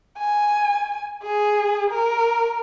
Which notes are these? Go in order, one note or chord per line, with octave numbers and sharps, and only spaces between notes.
G#5
G#4
A#4